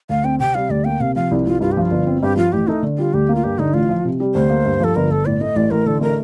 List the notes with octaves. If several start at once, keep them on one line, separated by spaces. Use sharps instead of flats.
D2 F5
C4 G5
C3 G5
G3 F5
D2 D5
A#3 G5
C3 F5
F3 F5
C2
C2 F4
G2 F4
G4
F3 F4
G1
C4
G2 G4
F3 F4
A1 G4
A3 D#4
D3
G3 F4
D2 G4
A#3
F4
G2 G4
D3 D#4
A1 F4
F3
C3
G3
D2 C5
A#3
G2
F3 A4
G1 A#4
G1 A4
A2 D5
A3 D#5
A1 D5
A1 A#4
D3 A4
A3 A#4